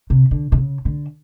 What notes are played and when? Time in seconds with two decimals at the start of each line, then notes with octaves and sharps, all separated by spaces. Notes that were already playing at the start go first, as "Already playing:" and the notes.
0.10 C3
0.31 D3
0.52 C3
0.58 C#3
0.85 D3